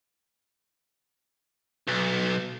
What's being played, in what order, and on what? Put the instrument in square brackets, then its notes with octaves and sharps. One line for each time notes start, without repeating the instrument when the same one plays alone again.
[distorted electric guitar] B1